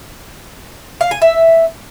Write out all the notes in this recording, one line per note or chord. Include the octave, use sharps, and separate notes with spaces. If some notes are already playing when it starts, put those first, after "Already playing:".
F5
G#5
E5